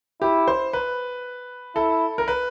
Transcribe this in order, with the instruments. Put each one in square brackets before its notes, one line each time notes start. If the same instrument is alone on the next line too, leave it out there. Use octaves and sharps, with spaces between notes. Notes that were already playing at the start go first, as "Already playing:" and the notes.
[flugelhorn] E4 [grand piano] G4
[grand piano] C5
B4
[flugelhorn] E4 [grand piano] A4
[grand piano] A#4
B4